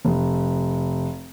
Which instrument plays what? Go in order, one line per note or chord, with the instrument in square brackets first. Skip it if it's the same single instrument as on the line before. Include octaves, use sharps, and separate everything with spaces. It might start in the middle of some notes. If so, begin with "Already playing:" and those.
[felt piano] F1